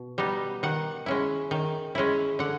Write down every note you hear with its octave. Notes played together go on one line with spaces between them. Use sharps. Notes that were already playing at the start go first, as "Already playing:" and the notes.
Already playing: B2
G3 B3 D#4
D#3 F#5
G#3 C#4 E4
D#3
G#3 C#4 E4
D3 F#5